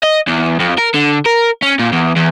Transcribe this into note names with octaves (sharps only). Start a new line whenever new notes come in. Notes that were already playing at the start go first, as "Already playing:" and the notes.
D#5
E2
F2
A#4
D3
A#4
C#4
A#2
E2
E2